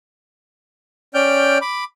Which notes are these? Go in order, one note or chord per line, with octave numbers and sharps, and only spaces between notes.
C#4 D5 G5 F6 G6
B5 D6